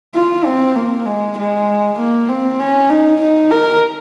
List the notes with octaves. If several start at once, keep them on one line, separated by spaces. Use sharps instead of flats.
F4
C4
A#3
G#3
G#3
A#3
C4
C#4
D#4
D#4
A#4